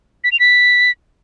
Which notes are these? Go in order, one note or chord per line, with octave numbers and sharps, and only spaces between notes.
B6
F7
B6